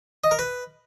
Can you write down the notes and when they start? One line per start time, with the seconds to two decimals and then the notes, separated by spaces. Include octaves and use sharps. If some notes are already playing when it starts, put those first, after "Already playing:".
0.24 D#5
0.31 A#4
0.39 B4